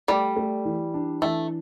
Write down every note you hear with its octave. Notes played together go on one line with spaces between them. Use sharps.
G3 A3
A3
E3
D4
E3 A3